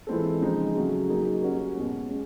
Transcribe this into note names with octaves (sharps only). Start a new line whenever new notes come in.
E3 G#3 C4 F4 A4
C#3 F3 G#3 C4 D#4
C#3 F#3 A3
F#3 A#3 D#4 G#4
G3 A#3 C#4 F#4
B2 G#3 C#4
G#3 C#4